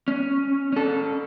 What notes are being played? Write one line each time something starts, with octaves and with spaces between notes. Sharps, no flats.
C#4
C#4 A4